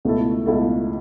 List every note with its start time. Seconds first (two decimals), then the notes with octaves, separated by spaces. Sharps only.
0.05 C#2 B2 A3 E4 A4
0.46 C#2 B2 A3 E4 A4